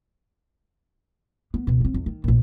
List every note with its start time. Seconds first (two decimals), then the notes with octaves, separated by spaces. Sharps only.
1.54 B3
1.67 C#2 B2
1.80 A3 C4
1.94 E2
2.06 D#3
2.24 A#1 A#2